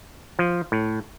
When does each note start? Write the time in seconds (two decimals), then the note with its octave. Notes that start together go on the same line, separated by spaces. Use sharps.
0.39 F3
0.72 A2